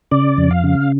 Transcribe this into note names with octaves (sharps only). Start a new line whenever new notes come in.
C#3 D5
F2
F5
C#3